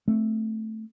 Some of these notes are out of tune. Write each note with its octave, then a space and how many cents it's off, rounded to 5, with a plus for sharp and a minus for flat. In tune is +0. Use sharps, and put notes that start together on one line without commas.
A3 +0 C4 +0